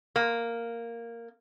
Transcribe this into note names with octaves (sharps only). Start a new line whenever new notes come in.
A#3